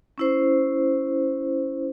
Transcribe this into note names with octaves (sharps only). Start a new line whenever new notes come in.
C#4 E4 C5